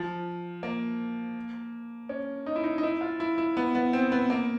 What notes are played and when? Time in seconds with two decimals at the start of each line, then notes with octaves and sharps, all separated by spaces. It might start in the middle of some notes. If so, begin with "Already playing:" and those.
Already playing: F3
0.63 A#3
2.09 C#4
2.46 D#4
2.56 E4
2.64 D#4
2.78 D#4
2.83 E4
3.01 F4
3.20 E4
3.38 E4
3.57 B3
3.75 B3
3.93 C4
4.12 B3
4.30 A#3